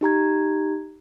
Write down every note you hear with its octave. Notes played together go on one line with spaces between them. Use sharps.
D#4 G4 A#5 G#6